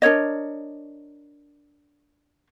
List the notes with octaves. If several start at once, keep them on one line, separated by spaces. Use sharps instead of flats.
D4 A#4 C#5 D#5